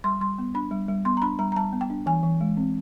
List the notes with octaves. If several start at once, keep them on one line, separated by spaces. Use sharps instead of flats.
G3 C6
G3 C6
B3
D4 B5
G3
G3
B3 C6
A#5
D4 B5
G3 A#5
A#5
G3 A5
B3
G5
D4
E3 G#5
E3
G#3
C4